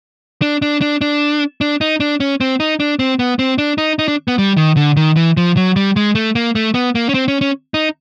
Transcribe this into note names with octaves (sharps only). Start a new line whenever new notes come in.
D4
D4
D4
D4
D4
D#4
D4
C#4
C4
D#4
D4
C4
B3
C4
D4
D#4
D#4
D4
B3
G3
D#3
D3
D#3
E3
F3
F#3
G3
G#3
A3
A#3
A3
B3
A#3
C#4
C4
C#4
C#4
D#4